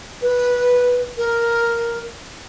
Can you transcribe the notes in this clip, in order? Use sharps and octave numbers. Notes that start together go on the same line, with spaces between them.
B4
A#4